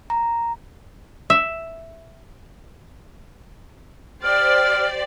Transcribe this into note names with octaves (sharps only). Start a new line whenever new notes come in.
A#5
E5
G4 C5 D5 F6